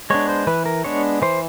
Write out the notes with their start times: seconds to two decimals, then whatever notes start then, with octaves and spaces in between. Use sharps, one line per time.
0.10 G#3 B3 D4 C#5
0.29 C5
0.47 E3 B4
0.66 A#4
0.84 G#3 B3 D4 C#5
1.22 E3 C5